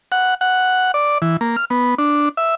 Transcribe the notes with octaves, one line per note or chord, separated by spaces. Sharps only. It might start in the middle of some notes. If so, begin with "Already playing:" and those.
F#5
F#5
D5
E3
A#3
F6
B3
D4
E5